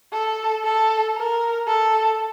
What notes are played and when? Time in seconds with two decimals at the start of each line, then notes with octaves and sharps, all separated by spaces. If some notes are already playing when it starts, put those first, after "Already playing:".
0.12 A4
0.64 A4
1.16 A#4
1.68 A4